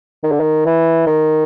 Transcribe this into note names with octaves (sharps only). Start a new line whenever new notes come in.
D#3
D3
D#3
E3
D#3